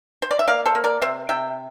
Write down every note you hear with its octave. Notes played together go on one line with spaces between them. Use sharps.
C5
D5
E5
A#3 D5 F5
A4 C5
A#3
A#4 D5
C3 C5 E5
C3 E5 G5